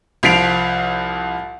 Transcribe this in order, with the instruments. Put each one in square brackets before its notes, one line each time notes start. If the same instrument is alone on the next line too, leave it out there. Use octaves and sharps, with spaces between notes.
[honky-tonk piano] C2 F3 B6 C7 D7 F7